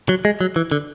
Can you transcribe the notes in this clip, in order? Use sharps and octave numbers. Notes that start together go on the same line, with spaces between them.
F#3
G#3
F#3
E3
D3